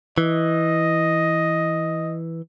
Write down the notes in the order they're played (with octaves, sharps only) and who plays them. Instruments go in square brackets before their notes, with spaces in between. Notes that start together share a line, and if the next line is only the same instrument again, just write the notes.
[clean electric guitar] E3 [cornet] D#5